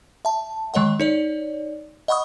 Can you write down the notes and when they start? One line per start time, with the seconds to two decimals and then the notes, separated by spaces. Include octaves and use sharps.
0.25 E5 A5
0.74 D#3 G#3 C#5 D#5 F#5
1.00 D#4 C#5 D5
2.08 D#5 F#5 B5 C#6 D#6